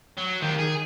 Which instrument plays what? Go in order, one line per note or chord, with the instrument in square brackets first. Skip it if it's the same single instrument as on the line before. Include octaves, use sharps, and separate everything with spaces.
[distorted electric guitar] F#3
[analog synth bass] D#3 [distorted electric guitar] F3 G4
[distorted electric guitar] G#4